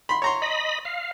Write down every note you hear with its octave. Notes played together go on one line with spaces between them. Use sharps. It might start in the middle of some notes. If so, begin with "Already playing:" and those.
B5 C6
C#5 A#5 C6
D#5 B5
F5